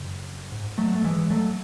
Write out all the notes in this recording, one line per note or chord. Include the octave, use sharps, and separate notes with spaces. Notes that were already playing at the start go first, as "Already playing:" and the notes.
Already playing: F#2 C#3
G#2
F#3 A3
A3
E3 G#3
F#3 A3